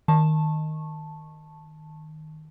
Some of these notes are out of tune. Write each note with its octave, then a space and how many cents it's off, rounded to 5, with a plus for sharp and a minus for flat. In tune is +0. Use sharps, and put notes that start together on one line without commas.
D#3 +0 A5 +0 C#6 -20